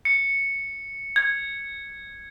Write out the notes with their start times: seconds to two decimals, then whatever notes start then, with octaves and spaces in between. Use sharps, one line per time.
0.05 C#7
1.16 G#6